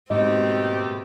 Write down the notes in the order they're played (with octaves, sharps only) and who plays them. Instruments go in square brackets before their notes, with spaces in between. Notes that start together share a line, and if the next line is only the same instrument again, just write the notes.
[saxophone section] D#2 A3 G4 [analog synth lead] G#2 [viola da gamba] B2 C4 [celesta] D#5